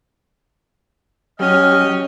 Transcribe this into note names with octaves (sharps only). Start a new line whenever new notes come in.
F#3 C#4 G4 D#5 F6